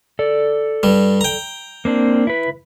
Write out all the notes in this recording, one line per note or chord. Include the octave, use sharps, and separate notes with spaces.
A4 D5
G2 G3
G5 A#5
A#3 C4 D4
E4 B4